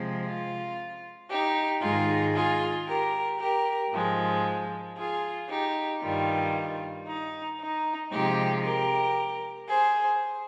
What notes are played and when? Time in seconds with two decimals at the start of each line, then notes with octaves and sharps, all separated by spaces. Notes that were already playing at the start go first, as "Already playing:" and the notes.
Already playing: C3 F3 G#3
0.25 F4
1.29 D#4 G4
1.82 G#2 D#3 G#3 F4 G#4
2.34 F4 G#4
2.88 G4 A#4
3.39 G4 A#4
3.92 G#2 F3 G#3
4.97 F4 G#4
5.49 D#4 G4
6.02 G2 D#3 G3 F4
7.07 D#4
7.60 D#4
8.12 C3 F3 G#3 D#4 G4
8.64 G4 A#4
9.69 G#4 C5